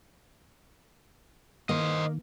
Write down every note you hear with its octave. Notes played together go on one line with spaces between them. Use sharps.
D#3 A#3 C5 D#5